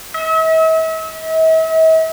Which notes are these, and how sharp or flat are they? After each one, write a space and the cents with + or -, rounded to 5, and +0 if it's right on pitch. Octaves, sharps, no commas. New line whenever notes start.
E5 -40